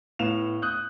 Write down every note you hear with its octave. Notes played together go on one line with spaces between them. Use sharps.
A2 B3 F5 E7 F7
D#6 F#6 G6